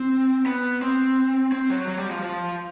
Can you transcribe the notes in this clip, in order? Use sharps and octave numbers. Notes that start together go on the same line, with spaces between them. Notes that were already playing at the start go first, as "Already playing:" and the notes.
Already playing: C4
B3
C4
C4
F#3
F#3
G3
F3
F3